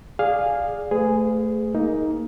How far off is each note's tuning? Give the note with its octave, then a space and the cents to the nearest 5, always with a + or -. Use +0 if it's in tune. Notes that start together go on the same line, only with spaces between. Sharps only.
G#4 -10 D5 +0 F5 +5
A3 +0 G#4 +0 B4 +45
A#3 +0 D#4 +15